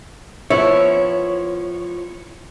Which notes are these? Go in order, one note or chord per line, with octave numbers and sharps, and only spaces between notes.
F3 B3 E4 C#5